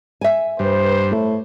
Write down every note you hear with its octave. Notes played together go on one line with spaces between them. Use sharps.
E5 G#5
G2 B4 C5
A2